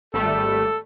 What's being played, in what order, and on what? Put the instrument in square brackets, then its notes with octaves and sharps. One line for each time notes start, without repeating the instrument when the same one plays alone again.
[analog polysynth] G#1 G3 A3 [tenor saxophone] A4